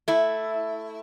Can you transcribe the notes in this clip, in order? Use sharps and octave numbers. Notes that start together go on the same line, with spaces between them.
A3 E4